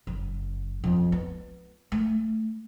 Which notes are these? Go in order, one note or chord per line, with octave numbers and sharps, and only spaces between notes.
F#1
F2
B3
A3